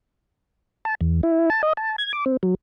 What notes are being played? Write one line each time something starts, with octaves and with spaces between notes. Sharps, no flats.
A5
E2
E4
A5
D#5
A5
G#6
D6
C4
F#3